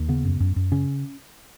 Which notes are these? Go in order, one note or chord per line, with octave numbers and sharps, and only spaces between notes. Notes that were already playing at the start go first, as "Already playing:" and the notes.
Already playing: D#2
C#3 B3
F#2
F#2
F#2
C#3 C#4